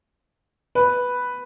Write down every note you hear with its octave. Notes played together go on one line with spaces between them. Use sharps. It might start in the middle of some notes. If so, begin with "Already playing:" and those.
B4